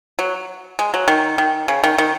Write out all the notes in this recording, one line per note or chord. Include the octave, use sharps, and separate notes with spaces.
F#3
G#3
F#3
D#3
D#3
C#3
D#3
D#3